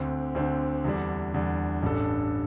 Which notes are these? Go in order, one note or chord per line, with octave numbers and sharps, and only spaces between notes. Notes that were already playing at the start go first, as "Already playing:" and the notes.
Already playing: D2 D3 C4
D2 D3 C4
E2 D3 G3 D4
E2 D3 G3 D4
A1 G2 G3 D4 A4